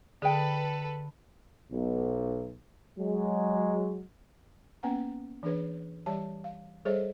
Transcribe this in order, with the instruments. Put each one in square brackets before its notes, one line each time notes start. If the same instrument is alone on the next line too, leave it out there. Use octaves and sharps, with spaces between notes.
[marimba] D3 [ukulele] G#4 G5 [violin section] A4 B4
[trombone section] B1
F#3 G#3
[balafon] A#3 B3 C#4 B4 F#5 A#5
E3 D4 G#4 B4 C#5
E3 G3 G4 C#5 D5 A5
F5
G3 G#4 A4 C5 C#5 D#5